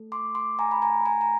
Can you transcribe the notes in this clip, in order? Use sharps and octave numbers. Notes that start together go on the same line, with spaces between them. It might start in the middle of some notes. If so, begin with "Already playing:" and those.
Already playing: A3 A4
C6 D6
C6 D6
G#5 A#5
B5
G#5 A#5
G#5 A#5
A#5